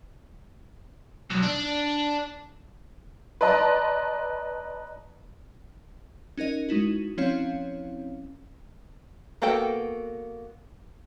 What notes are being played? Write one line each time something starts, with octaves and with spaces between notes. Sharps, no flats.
B1
D4
B4 D5 D#5 A5 A#5 C6
C#4 D#4 A#4 D#5
G#3 D#4 E4 F#4
F3 C4 C#4 E4 C#5 F5
A#3 B3 F#4 A4 G5